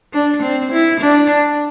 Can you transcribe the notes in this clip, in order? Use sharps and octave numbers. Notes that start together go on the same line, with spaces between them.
D4
C4
E4
D4